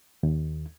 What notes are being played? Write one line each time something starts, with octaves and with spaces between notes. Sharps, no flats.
D#2